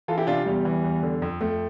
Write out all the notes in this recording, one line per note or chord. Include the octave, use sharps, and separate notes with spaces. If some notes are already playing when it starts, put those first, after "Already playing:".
E3 F4 A4
E4 G4
C3 D4 F4
E2 G3
E3
E2
D3
F2
F2 A3